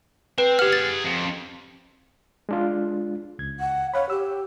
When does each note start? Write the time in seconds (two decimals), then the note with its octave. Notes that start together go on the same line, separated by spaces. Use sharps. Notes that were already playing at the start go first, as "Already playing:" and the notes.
0.38 C4 B4
0.59 G4 G#4 F#5 F6
0.73 A6
1.04 F2
2.49 G#3 D4 F4
3.39 C#2 G#6
3.60 F#5
3.94 C#5 F5 F#5 B5
4.10 G4 E6